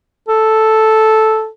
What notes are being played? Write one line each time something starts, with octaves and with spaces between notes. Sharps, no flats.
A4